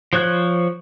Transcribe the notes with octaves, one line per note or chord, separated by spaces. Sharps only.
F3 C5 C#5 F#6